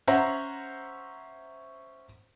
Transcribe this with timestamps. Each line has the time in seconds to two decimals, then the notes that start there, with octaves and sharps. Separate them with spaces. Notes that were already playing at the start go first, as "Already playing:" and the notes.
0.07 C#4 C5 C#5 E5 F#5 A#5